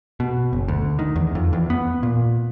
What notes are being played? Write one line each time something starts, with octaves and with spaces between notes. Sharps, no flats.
B2
F#1
D2
D#3
E2
F2
E2
B3
A#2